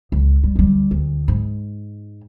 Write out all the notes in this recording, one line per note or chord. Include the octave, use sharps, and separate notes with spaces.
C#2
G3
D2 G3
D2
G#2